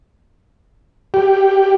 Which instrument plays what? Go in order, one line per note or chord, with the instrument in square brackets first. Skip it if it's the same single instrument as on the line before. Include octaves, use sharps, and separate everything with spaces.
[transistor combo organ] G4